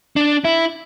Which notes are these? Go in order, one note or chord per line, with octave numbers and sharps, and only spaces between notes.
D4
E4